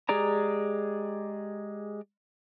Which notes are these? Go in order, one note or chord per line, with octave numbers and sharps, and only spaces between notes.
G#3 G4 G#4 D5 A#5